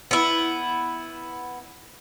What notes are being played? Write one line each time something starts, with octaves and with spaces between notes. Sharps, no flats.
B3 E4